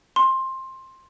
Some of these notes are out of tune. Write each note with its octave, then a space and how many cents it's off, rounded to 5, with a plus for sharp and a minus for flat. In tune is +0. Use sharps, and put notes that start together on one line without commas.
C6 +15